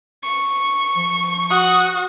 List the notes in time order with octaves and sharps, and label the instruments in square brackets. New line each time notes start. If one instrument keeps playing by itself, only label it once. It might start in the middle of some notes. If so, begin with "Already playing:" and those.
[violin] C#6
[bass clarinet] F3
[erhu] F#4 [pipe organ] D#6